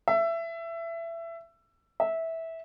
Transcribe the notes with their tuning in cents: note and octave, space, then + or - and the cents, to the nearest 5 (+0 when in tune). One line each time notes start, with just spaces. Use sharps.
E5 +20
E5 -15